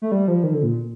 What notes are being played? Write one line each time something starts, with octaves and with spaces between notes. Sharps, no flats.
A3
G3
F3
D#3
D3
A#2